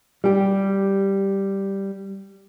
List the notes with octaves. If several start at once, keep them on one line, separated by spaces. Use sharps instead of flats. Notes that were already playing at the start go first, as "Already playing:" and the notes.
G3 G4